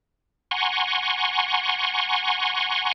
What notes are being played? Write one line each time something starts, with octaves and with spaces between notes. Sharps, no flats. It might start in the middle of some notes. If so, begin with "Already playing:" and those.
F#5 G#5 A#5 C6 C#6